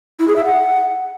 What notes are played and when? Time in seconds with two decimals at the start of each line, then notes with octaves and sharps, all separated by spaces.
0.19 E4
0.28 G#4
0.36 E5
0.44 F#5